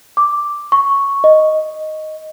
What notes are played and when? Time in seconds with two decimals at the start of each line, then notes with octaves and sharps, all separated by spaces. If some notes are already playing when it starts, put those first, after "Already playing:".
0.17 D6
0.72 C#6
1.24 D#5